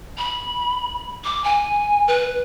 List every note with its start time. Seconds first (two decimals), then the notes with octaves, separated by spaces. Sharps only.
0.18 B5
1.24 D6
1.44 G#5
2.08 B4